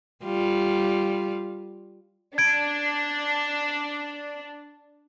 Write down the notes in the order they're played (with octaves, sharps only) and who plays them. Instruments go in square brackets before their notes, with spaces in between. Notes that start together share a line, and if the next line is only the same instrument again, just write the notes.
[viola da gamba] G3 F4
[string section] D4 [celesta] G#6 D7